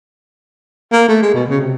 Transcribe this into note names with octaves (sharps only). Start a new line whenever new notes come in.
A#3
A3
G#3
B2
C#3
C3